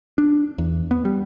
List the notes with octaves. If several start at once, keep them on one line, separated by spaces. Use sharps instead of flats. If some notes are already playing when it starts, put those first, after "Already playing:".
D4
E2
B3
G3